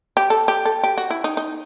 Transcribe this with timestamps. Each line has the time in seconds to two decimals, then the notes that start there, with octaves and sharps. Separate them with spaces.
0.17 G4
0.30 A4
0.48 G4
0.65 A4
0.84 G4
0.97 F#4
1.10 E4
1.24 D#4
1.37 D#4